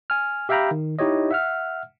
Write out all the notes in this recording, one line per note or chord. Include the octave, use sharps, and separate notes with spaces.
G#5 F6
G4 E5 F5 G5 A#5 B5
D#3
D#4 E4 G4 C#5 D#5
E5 F#5 F6